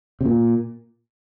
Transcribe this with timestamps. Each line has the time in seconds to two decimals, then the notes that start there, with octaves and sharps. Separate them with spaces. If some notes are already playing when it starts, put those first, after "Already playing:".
0.21 C3
0.26 A#2